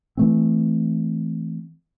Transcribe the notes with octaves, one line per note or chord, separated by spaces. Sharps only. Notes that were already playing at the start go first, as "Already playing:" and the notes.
E3 A3 C4